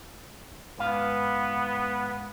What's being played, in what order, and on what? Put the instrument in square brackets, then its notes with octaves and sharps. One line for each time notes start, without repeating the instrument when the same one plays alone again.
[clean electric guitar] G#2 B4 F5 [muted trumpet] B3